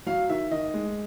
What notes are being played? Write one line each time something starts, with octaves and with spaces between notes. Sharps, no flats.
F#3 F5
D#3 E5
D#3 D#5
G#3